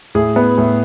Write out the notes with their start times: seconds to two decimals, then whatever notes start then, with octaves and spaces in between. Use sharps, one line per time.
0.15 A2 G#4
0.36 B3
0.58 A2